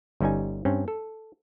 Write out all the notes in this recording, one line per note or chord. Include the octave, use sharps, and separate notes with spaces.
G1 G3 C#4 D#4 G#5
G2 C4 C#4
A4